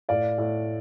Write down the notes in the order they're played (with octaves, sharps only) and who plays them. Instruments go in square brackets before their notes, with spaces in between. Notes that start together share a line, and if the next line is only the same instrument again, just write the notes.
[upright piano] A2 D5 F5
A2